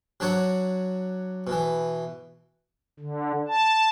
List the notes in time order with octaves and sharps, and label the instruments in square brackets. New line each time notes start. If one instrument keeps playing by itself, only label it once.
[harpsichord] F#3 D4 F#4 C#5
B2 E3
[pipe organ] D3
A5